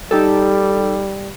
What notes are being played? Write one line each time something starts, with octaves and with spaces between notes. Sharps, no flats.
G3 D#4 G4 A4